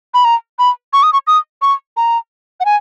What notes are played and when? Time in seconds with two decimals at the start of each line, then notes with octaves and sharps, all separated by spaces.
0.14 B5
0.25 A#5
0.59 B5
0.93 C#6
1.03 D#6
1.13 C#6
1.27 D#6
1.62 C#6
1.97 A#5
2.60 F#5
2.65 G#5